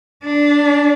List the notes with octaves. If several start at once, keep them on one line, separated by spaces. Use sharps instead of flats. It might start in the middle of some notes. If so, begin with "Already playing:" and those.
D4